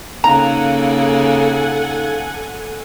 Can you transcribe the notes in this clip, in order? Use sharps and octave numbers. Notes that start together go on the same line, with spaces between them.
C#3 A#3 D#4 A4 F5 F#5 G#5 A#5